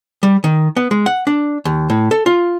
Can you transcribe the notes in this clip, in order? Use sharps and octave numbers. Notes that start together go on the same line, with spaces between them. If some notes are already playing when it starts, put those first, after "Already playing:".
G3
D#3
B3
G#3
F#5
D4
D#2
A2
A4
F4